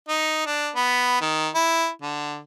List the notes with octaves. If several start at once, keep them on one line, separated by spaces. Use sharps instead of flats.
D#4
D4
B3
D#3
E4
D3